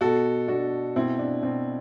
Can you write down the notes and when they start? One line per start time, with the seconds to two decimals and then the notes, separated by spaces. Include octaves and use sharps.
0.01 B2 F#4 A4
0.48 B2 D4 F#4
0.96 B2 C4 E4
1.19 D4
1.42 B2 C4